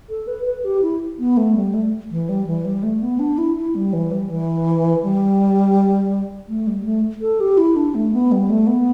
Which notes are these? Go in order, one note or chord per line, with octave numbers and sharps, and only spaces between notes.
A4
B4
B4
G4
E4
B3
A3
G3
A3
E3
G3
E3
G3
A3
B3
D4
E4
E4
G3
E3
G3
E3
G3
A3
G3
A3
A4
G4
E4
D4
A3
B3
G3
A3
B3